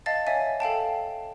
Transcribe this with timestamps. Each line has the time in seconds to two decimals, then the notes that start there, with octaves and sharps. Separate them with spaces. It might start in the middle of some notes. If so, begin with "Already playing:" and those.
0.06 D#5 F5 A5 A6
0.27 C#5 D#5 E5 G#5
0.60 A4 F5 G5 A5